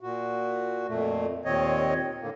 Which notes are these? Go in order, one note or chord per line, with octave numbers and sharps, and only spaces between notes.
A#2 F#4
F2 A#2 A3
D#2 A#2 D#3 C4 C#5 D#5
A2 D3 A#3